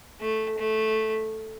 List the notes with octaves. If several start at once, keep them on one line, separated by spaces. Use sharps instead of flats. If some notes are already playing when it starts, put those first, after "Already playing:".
A3
A3